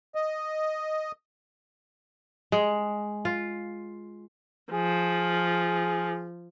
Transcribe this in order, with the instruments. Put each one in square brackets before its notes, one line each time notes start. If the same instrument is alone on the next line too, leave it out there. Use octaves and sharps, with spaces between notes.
[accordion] D#5
[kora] G#3
F4
[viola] F3 [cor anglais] G#4